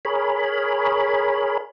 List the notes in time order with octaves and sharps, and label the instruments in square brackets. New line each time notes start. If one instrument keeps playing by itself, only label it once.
[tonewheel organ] G#4 A#4 C#5 B5